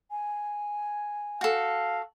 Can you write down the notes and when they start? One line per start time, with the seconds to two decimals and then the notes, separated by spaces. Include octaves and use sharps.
0.11 G#5
1.41 F#4 A4 F5